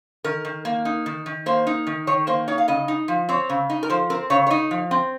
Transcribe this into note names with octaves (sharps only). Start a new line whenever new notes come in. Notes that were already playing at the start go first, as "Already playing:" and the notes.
D#3 A#4
D#3
A#3
D#4
D#3
D#3
A#3 C5
D#4
D#3
D#3 C#5
A#3 C5
D#4 C#5
F5
C#3 D#5
D#4
F3
C4 C#5
C#3
D#4
A#4
F3 C5
C4 A#4
C#3 C#5
C#5
D#4 D#5
F3
C4